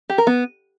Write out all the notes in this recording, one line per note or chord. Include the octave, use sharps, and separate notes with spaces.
G4
A#4
B3